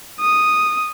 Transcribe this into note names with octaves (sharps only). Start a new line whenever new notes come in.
D#6